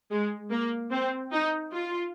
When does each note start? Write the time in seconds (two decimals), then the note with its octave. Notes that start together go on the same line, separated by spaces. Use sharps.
0.11 G#3
0.51 A#3
0.92 C4
1.33 D#4
1.72 F4